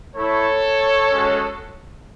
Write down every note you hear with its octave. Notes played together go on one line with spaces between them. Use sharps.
A3 E4 A4 C#5
G#3 C#4 F#4